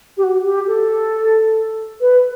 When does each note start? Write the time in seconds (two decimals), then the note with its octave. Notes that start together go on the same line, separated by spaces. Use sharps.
0.17 G4
0.23 F#4
0.44 G4
0.67 A4
2.00 B4